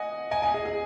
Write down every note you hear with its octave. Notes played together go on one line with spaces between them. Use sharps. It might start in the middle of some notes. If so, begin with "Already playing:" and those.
Already playing: D#5 F#5 G#5
D#5 G#5
D#5 G#5
G#4
G#4